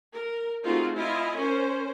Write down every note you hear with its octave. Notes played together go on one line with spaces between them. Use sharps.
A#4
A3 C4 D#4 F4 F#4 G#4
E4 F4 D#5 G#5
C#4 A#4 C5